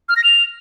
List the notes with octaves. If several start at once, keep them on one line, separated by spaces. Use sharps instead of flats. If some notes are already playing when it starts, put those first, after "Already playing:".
F6
A#6
F7